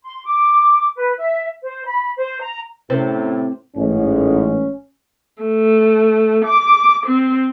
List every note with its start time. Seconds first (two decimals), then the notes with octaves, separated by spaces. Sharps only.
0.04 C6
0.26 D6
0.96 B4
1.18 E5
1.63 C5
1.86 B5
2.17 C5
2.41 A#5
2.90 A2 C3 C#4 A#4 C5 A6
3.76 A1 G#2 C#4
5.43 A3
6.45 D6
7.07 C4